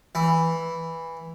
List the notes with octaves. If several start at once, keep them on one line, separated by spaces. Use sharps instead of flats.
E3